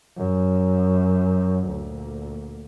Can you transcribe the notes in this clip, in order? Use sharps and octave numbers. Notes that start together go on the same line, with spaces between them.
F#2
D2 A#2